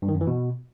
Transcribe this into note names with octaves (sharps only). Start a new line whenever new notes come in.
G2
D#3
F#2
E3
B2